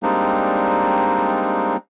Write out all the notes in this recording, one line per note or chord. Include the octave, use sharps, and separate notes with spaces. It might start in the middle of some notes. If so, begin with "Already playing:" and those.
G3 G#3 A#3 C4 D4 D#4